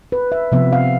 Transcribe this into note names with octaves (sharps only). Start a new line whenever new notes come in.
B4
E5
C3 F3 B3 E5
F5